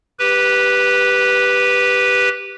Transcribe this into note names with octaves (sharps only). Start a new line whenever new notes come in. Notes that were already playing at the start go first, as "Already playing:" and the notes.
G4 B4